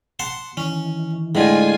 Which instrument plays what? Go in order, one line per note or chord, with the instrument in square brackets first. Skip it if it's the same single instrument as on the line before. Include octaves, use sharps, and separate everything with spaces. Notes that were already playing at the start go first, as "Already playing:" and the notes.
[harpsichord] F#5 A5 C6
[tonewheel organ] D#3 E3 [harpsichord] C#4
[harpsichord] A2 D3 [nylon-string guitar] G#3 [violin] F4 G#5